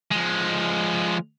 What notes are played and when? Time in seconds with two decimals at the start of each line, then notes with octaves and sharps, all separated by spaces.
0.12 F3 G#3